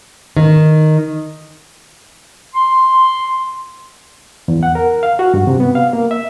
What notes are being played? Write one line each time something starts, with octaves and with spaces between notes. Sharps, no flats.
D#3
C6
E2
F#5
A#4
F5
F#4
G2
C3
B3
F5
A#3
E5